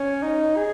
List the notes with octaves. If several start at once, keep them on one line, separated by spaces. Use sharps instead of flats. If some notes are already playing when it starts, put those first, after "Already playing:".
Already playing: C#4
D#4
G#4